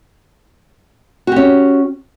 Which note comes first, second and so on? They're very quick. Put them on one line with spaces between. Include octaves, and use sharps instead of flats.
F#4 G4 C#4